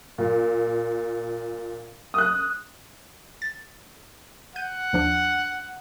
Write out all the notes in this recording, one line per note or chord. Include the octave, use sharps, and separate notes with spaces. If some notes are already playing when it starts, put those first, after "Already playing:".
A#2
D#6 F#6
A6
F#5 G6 D#7
D#2 F3 D4